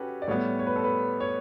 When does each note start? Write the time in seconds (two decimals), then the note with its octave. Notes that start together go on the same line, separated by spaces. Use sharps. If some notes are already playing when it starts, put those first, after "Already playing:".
Already playing: C#4 F#4 G4 A4 B4
0.22 D5
0.28 A2 G3 B3 C#5
0.59 C#5
0.67 B4
0.76 A4
0.84 B4
1.20 C#5